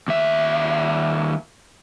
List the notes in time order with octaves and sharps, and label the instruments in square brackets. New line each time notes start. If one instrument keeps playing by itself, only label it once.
[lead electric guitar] D#2 E5